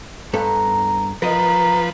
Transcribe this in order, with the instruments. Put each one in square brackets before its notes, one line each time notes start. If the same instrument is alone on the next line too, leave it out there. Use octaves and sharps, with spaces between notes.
[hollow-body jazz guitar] G2 B3 A4 [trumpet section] A#5
[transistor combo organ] F3 B4 [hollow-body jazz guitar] A#4 D#5 [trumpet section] A#5